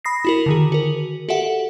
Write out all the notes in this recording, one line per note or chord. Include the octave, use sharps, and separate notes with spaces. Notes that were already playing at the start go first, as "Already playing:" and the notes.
B5 D#6 A#6 C7
E4 F#4 A#4
D3 D#3 G#4
F#4 A#4
F#4 G4 A4 E5 F#5